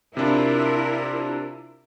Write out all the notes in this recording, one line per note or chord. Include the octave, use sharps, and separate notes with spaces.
C3 D4 E4 F4 A#4